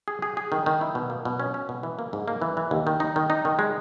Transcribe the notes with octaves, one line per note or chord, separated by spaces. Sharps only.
G#4
G#4
G#4
D#3
D#3
E4
B2
A#3
B2
C#4
C#4
B2
E3
A#3
G#2
A#3
E3
E3
D#2
D#3
D#4
D#3
D#4
D#3
G#3